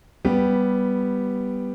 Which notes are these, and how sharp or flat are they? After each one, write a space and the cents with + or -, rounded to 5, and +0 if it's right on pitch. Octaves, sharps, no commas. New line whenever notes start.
G3 +0 B3 +0 G4 +0